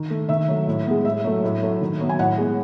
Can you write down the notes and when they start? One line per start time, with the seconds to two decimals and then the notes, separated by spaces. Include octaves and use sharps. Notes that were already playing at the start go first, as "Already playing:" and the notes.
Already playing: D#3
0.10 A3
0.29 D#3 E5
0.48 F#3 A3
0.67 A2
0.86 G#3 B3
1.05 A2 E5
1.24 F#3 A3
1.44 A2
1.62 F#3 A3
1.81 D#3
2.00 F#3 B3
2.09 G#5
2.19 A2 F#5
2.38 G#3 B3